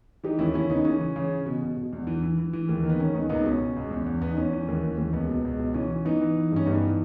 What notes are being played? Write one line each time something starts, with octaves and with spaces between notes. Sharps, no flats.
E3 D#4 G4
D#2 C#4 E4
D#2 C#4 E4
C#3 B3 D#4
E3 C#4
E3
C#3
E3
B2
B2
B2
E2
E3
E3
E3
E3
D#2
D#3
B3
D#3 C#4
D#2 B3 D#4
C#2 B3 D#4
B2 C#4
B2
C#2
E2
E2
E2 B3
D#4
E2 C#4
E3
D#2
E3
D#2
C#2 B3
B2
C#2
B2
E3 C#4
E3
E3 B3 D#4
E3
E3
G2 C#4
G2 B3 D#4
E3